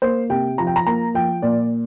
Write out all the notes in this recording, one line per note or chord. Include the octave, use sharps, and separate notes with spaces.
A#3 C5
C3 G5
F3 A#5
G5
A#5
A#3 A#5
F3 G5
A#2 D5